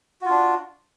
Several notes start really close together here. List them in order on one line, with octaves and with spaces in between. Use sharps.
F#4 F4 D4